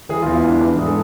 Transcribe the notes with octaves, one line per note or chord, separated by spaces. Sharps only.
E3 G#4
F4
E2
E4
E2 D4
E3 D4
G#2 G#4
A4